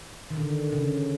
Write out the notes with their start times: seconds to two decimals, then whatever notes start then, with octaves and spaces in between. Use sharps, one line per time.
0.30 D#3
0.37 D3
0.72 C#3